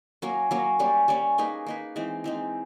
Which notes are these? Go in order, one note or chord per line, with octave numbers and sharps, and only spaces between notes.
F#3 A#3 C#4
F#3 A#3 C#4
G3 A#3 C#4
G3 A#3 C#4
A#3 D#4 G#4 B4
A#3 D#4 G#4 B4
E3 G#3 C4 D#4
E3 G#3 C4 D#4